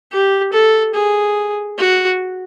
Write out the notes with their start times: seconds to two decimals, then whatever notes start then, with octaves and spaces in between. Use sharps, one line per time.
0.12 G4
0.53 A4
0.94 G#4
1.78 F#4